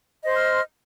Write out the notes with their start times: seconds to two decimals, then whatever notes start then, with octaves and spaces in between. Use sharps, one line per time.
0.23 D#5
0.27 C5
0.30 C6
0.34 F6